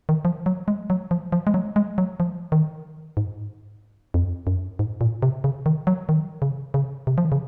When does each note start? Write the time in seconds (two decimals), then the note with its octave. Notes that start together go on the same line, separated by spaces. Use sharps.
0.09 D#3
0.25 F3
0.46 F#3
0.68 G#3
0.90 F#3
1.11 F3
1.32 F3
1.47 G#3
1.54 F#3
1.76 G#3
1.98 F#3
2.20 F3
2.52 D#3
3.17 G#2
4.14 F2
4.47 F#2
4.79 G#2
5.01 A#2
5.22 C3
5.44 C#3
5.66 D#3
5.87 F#3
6.09 D#3
6.42 C#3
6.74 C#3
7.07 C3
7.18 F3
7.25 D#3
7.32 C#3